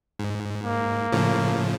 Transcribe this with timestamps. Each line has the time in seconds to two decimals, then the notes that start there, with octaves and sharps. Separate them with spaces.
0.19 G#2
0.64 A#3
1.12 A2 C#3 F3